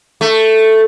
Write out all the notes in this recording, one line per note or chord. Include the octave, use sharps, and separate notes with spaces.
A3